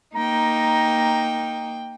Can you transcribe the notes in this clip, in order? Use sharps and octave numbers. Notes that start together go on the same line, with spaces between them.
A#3 D#4 G5 A#5